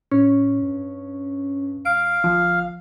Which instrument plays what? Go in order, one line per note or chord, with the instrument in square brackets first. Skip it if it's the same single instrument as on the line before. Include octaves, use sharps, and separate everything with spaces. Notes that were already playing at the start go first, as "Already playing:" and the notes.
[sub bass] A2 [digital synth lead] C#4
[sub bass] G2
[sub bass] E1 [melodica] F5 [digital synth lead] D7
[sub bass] G1 [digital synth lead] F3